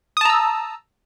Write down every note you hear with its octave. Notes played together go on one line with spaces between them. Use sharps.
A5 A#5 D#6 E6